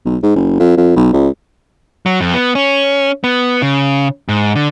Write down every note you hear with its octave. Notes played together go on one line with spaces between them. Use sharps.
B1
G#2
F#1
F2
F2
B1
C#2
F#3
F2
B3
C#4
B3
C#3
G#2
D3